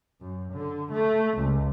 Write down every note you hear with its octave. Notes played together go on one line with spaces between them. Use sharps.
F#2
D3
A3
C#2